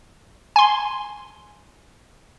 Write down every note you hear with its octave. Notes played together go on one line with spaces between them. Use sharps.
G#5 C6